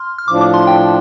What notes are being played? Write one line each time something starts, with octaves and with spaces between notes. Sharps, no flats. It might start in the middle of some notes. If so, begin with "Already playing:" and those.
Already playing: C6 F6
F6
A2 F3 D4 D6
D6
C6
G5